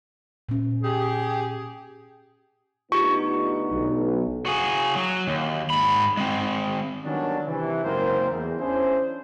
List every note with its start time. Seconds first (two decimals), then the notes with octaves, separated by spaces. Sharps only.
0.49 A#2 C#4
0.82 G4 G#4
2.92 D2 B3 D#4 F4 G4 C#6
3.72 B1
4.46 F#4 G#4
4.95 F#3
5.28 D#2
5.70 G#2 B5
6.17 G#3 C4
7.04 D#3 F#3 G3 B3 C#4 D4
7.46 C3 E3
7.83 F#1 G#2 A#3 C4 A#4 C5
8.30 E2
8.59 C#4 D4 E4 G#4 C5